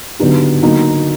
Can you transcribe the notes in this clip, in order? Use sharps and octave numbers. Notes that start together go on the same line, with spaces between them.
D3 F#3 B3 D#4 G4
D3 F#3 A#3 D#4